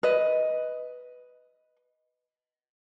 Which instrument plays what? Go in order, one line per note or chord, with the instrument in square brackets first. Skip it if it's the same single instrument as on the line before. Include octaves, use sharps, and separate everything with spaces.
[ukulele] B4 D#5